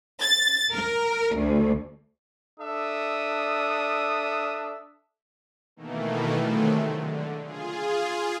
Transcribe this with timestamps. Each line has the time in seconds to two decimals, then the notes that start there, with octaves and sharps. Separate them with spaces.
0.20 A6
0.73 A#4
1.36 D2
2.60 D4 A4 E5 D#6
5.76 B2 D#3 E3 A3 A#3
6.41 C3 D#3 F#3 G#3 A3
6.84 D3
7.42 F4 G#4